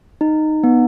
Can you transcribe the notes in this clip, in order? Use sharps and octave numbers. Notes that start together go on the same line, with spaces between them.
D#4
B3